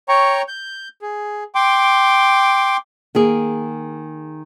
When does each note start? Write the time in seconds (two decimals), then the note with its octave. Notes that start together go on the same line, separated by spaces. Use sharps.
0.09 C#5 G5 A#5 C#6
0.48 G6
1.02 G#4
1.55 G5 C6 D6
3.15 D#3 A#3 G#4